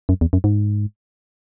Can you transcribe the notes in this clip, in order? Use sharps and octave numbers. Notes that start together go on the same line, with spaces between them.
F#2
E2
F#2
G#2